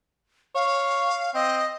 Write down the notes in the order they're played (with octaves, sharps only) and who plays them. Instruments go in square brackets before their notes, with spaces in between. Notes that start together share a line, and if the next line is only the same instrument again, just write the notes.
[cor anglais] C#5 [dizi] F5
[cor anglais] C4 [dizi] D#5